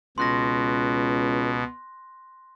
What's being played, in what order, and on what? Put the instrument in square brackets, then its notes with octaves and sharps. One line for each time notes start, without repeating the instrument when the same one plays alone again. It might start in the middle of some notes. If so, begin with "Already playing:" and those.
[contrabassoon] C#2 [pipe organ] B2 [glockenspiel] C6 F#6 A#6